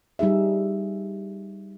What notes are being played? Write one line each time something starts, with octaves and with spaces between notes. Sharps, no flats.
G3 D#4 G#4 E5